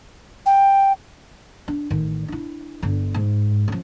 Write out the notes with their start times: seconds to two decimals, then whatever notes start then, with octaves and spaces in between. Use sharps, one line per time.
0.46 G5
1.68 D4
1.90 A1 D#3
2.28 D4 E4
2.83 G1 D3
3.14 G#2
3.68 F3 C#4